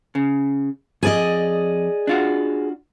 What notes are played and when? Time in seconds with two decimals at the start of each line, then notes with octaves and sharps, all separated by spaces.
0.15 C#3
1.03 F2 G#4 D5 D#5
2.07 D4 F4 F#4